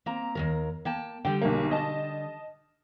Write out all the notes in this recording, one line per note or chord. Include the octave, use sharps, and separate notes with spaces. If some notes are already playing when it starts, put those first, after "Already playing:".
A#3 C4 A#5
D#2 F#3 A#4
A#3 G5 A5
D3 G3 G5
B1 A#3
D#5 A5